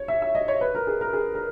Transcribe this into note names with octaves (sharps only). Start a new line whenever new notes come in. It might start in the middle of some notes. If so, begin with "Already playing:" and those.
Already playing: C#5
E5
E5
D#5
C#5
B4
A#4
G#4
A#4
G#4
A#4